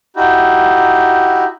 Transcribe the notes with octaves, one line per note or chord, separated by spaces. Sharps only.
D#4 E4 F#4 G4